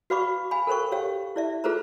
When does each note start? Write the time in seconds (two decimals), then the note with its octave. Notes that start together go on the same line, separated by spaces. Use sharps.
0.10 F#4 B4 F5 B5 C#6 D6
0.51 F5 G#5 B5
0.67 A4 A#4 C5 G5 C#6
0.92 G4 C#5 F5 G5
1.36 E4 D5 E5
1.64 F4 G#4 A4 B4 C5 A#5